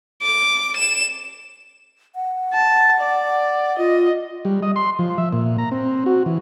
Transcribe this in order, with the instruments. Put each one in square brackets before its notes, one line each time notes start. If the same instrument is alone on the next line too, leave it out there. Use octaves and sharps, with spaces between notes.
[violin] D6
E7
[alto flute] F#5
[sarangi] A5
D5
[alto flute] F4 [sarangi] D#5
[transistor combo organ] G3
D#5
C6
F3
E5
A#2
A#5
C4
F#4
E3